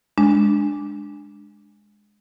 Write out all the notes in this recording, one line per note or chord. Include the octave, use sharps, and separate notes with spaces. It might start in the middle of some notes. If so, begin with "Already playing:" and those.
G#3 D4